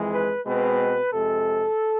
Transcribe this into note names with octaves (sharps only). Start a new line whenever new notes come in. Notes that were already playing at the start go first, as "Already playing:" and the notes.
Already playing: F2 E3 G#3
B4
B2 G#3 C4 B4
F2 C3 G#3 A4